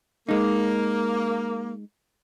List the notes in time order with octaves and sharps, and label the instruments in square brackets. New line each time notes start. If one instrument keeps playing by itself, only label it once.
[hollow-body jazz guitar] G#3 D#4 [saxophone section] A#3